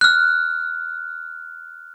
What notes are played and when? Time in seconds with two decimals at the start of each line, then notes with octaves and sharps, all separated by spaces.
0.01 F6 F#6